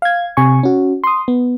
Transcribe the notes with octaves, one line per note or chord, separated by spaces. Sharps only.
F5 G#6
C3 G#5 C#6
C#4 F#4
C6 D#6
B3